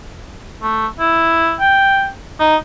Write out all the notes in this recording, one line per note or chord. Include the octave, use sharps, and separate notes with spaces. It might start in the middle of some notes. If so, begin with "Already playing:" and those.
A3
E4
G5
D#4